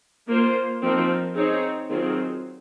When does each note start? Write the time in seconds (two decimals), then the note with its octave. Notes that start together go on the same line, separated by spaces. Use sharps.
0.28 A#3 F4 C5
0.82 F3 C4 D#4 A#4
1.36 C4 D#4 G#4 C#5
1.90 D#3 F#3 C4 F4 G#4